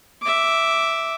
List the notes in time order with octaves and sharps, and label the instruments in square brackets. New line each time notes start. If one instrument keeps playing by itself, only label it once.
[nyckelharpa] E5 D6